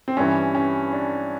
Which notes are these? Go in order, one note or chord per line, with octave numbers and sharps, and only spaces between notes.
C4
G2 E3 C#4
C#4
D4